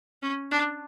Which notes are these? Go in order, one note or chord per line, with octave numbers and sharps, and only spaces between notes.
C#4
D4